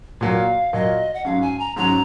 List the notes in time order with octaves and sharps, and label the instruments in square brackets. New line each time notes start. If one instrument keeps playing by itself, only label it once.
[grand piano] A#2 F#3 A#3 [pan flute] F5
[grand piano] A#2 F#3 A#3 [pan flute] D#5
[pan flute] F#5
[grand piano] G#2 F#3 C#4 [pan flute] F5
[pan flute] G#5
A#5
[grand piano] G#2 F#3 C#4 [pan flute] A#5